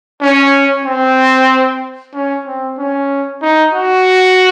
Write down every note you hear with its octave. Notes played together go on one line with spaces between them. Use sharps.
C#4
C4
C#4
C4
C#4
D#4
F#4